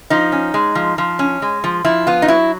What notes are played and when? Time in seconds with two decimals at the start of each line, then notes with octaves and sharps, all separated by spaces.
0.10 F3 D#4
0.32 C#4
0.54 G#3
0.75 F3
0.98 F3
1.19 C#4
1.42 G#3
1.64 F3
1.84 F3 E4
2.07 B3 F4
2.22 D#4
2.28 F#3 E4